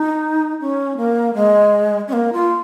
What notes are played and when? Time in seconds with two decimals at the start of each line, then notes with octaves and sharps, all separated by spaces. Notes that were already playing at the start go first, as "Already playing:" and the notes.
Already playing: D#4
0.61 C#4
0.97 A#3
1.34 G#3
2.08 C#4
2.13 A#3
2.33 F4